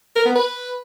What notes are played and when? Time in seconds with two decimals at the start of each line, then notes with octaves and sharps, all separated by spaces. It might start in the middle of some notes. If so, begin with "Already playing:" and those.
0.15 A#4
0.25 B3
0.35 B4